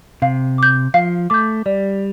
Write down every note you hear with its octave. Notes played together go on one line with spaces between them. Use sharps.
C3 F5
D6 G6
F3 F5
A3 D6 G6
G3 D5